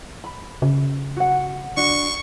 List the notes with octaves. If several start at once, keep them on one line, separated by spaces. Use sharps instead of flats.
B5
C#3
F#4 F#5
D4 F#4 C#6